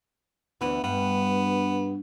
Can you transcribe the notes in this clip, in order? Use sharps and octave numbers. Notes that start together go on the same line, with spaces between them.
D2 E3 B3
G2 B3